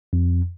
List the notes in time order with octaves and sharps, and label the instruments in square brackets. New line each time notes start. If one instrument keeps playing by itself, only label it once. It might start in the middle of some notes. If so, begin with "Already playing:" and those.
[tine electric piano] F2